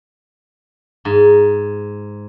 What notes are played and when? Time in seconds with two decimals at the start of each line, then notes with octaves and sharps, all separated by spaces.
1.05 G#2